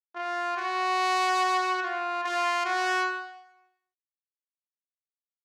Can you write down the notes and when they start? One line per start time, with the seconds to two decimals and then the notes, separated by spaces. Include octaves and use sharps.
0.15 F4
0.57 F#4
1.83 F4
2.24 F4
2.65 F#4